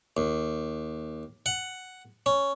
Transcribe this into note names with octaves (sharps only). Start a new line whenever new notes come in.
D#2
F#5
C#4